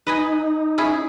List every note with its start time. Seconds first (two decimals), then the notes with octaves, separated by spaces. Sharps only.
0.07 D#4 B4 D#5 G#5
0.78 C#4 E4 G#4